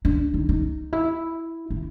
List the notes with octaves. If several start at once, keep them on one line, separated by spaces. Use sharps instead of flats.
D4
D#4
D#4
E4
E4